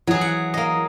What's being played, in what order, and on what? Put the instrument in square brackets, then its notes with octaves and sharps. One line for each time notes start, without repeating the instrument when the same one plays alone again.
[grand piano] E3 E4 [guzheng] F#3 G#4
[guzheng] F#5
A#3 D#5